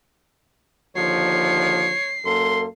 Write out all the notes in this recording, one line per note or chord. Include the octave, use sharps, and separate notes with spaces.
D#2 D3 F3 C#5 C7
F#2 A#3 A4 C6